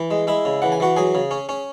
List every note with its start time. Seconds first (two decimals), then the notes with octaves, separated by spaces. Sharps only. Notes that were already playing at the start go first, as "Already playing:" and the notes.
Already playing: E3
0.11 G#3
0.27 G#3 E4 E5
0.45 C#3
0.62 E3 F#5
0.72 G#5
0.80 E3 F#4 F#5
0.97 F#3 G#4 G#5
1.15 C#3
1.31 C#4
1.49 C#4